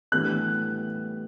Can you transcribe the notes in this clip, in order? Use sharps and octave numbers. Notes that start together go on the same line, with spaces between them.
A2 E3 G3 B3 D4 F#6